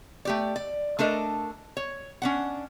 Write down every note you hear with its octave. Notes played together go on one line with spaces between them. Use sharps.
A3 G4 D5
D5
A3 D4 A4 A#4 D#5
C#5
C#4 D4 F#5